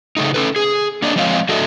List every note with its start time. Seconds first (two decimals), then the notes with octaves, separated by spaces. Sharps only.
0.17 C#3 A3 D#4
0.34 C#4 A4 B4
0.56 G#4
1.02 A#3 D4 D5 D#5
1.16 F3 G#3 C4 C#5 D#5 F5
1.49 A2 D4 F#4 A4 D#5 E5